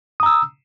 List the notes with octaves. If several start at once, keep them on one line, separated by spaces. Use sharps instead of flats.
A#5 D#6 E6